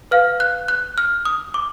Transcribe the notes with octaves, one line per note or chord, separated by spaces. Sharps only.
B4 F5 F6
F#6
F#6
F6
D#6
D6